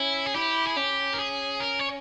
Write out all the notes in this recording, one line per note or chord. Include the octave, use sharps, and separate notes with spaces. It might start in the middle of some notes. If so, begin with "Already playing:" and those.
Already playing: C#4 E4
G#4
E4 G4
G#4
C#4 G4
A#4
G#4
A#4
C#5